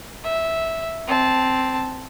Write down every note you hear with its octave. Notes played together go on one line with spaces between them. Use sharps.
E5
C4 A5